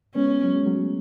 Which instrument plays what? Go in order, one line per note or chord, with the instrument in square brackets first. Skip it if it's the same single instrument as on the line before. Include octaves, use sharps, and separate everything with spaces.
[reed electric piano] G#3 B3 [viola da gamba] C#4
[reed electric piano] F#3
G#3
F#3 A3